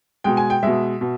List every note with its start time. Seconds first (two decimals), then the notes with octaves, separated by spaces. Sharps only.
0.24 B2 G#3 G5
0.37 G#5
0.50 G5
0.63 B2 G#3 E5
1.01 B2